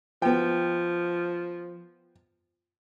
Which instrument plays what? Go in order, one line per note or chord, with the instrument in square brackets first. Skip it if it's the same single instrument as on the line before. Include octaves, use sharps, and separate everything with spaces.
[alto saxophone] F3 [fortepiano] B3 G5